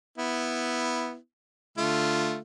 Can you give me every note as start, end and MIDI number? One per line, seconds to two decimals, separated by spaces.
0.18 1.16 59
0.18 1.16 64
1.78 2.38 50
1.78 2.38 57
1.78 2.38 65